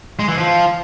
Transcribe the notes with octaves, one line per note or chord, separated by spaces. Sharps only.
G#3
E3
F3